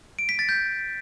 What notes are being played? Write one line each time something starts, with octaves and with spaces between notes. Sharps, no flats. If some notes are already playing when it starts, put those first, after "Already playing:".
D7
B6
A6
G6